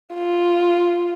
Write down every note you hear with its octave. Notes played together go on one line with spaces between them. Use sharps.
F4